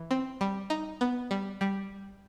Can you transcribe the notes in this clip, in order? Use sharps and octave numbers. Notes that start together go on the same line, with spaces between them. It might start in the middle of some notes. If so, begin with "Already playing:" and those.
Already playing: E3
C4
G3
D#4
B3
G3
G3